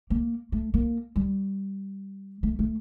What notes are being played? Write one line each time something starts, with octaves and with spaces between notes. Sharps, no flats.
A#3
A3
A#3
G3
A3
A3